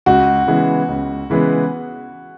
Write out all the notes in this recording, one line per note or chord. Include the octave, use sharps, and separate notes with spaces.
C#2 F#4
C#3 E3 G#3 B3
C#2
C#3 E3 G#3 B3